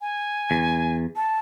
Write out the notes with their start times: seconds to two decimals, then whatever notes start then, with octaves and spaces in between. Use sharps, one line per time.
0.01 G#5
0.51 E2
1.16 A5